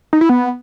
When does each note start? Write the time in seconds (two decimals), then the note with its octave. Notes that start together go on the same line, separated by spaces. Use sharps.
0.13 D#4
0.21 E4
0.29 B3